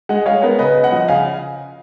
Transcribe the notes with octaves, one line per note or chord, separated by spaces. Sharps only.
G#3 D#5 F#5
G#3 C#5 F5
B3 A#4 C#5
C#3 B4 D#5
C#3
D#5 F#5
F3
C#3 F5 G#5